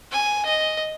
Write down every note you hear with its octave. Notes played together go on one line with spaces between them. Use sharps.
G#5
D#5